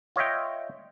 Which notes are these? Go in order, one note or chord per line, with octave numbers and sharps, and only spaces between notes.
F4 C#5 D#5 E5 G5